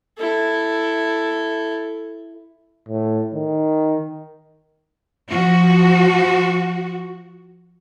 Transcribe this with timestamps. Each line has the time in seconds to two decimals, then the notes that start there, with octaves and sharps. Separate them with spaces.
0.18 E4 A4
2.88 A2
3.34 D#3
5.30 F3 F#4